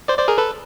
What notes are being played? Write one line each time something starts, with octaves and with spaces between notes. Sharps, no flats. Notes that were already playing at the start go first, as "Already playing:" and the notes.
C5 D5
C5 D5
G#4 A#4
A4 B4